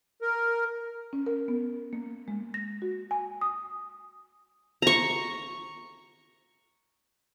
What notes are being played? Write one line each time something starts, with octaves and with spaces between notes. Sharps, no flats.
A#4
C#4
A#4
B3
A#3
G#3
A#6
F#4
G#5
D#6
A#5 C#6